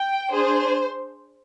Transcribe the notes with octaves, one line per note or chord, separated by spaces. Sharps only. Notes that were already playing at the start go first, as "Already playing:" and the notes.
Already playing: G5
D4 G#4 C5